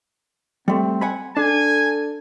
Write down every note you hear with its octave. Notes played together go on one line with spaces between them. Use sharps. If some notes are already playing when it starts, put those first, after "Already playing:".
G3 A3 C4
F#5 G#5 B5
D4 A4 G#5